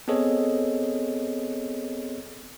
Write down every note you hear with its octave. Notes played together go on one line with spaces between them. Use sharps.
B3 C4 G#4 A4 C#5 D#5